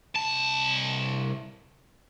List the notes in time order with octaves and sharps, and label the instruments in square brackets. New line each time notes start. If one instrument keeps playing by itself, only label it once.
[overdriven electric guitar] C2 A5